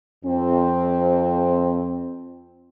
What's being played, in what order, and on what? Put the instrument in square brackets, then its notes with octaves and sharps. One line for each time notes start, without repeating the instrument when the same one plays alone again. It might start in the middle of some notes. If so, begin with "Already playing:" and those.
[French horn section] F2 C4